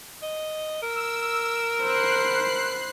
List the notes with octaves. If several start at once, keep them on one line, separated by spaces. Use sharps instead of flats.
D#5
A#4 E6
C5 B5 F#6 C7